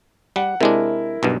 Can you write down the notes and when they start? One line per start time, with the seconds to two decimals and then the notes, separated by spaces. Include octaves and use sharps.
0.36 G3 F#5
0.61 C3 G#3 D4 E4 A#4
1.23 B1 G2 B2